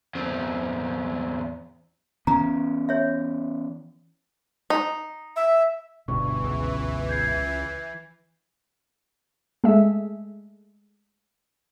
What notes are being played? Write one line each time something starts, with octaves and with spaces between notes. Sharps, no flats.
E2 C4
E3 B3 C#4 A#5
C#5 E5
D#4
E5
G1 D2 G2 B2 E3 C#6
C#2
G6 G#6 C7
G#3 A3 E5